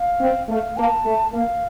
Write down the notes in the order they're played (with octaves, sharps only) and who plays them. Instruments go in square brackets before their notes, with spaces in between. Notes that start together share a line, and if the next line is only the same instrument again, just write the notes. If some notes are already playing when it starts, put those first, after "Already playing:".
Already playing: [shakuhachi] F5
[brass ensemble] C4
[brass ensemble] A3 [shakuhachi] F5
[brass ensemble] A#3 [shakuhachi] A5
[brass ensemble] A3
[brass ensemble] A#3 [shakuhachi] F5